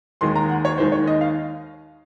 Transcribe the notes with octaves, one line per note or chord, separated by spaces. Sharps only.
D#2 D#3 G#3 C6
A#5
F#5
C#5
D#2 D#3 G#3 C5
C#5
D#5
F5